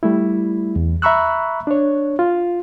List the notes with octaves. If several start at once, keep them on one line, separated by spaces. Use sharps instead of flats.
G3 A3 E4
E2
E5 A#5 B5 C#6 E6 F#6
D4 C#5
F4